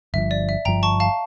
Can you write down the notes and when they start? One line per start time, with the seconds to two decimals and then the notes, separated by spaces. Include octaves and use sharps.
0.14 G1 G2 F3 E5
0.31 D5
0.49 E5
0.65 G1 G2 F3 G5 A#5
0.83 A5 C#6
1.00 F5 A5